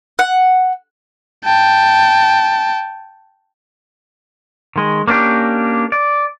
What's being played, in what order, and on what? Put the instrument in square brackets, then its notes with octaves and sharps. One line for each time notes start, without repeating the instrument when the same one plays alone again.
[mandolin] F#5
[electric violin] G5 A5
[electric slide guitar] D#3 G#3
A#3 C#4 D4 G4
D5